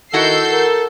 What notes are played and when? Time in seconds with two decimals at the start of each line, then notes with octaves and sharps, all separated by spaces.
0.13 D#3 E4 F#4 A4 F#5 E6 G6 C7
0.51 A#4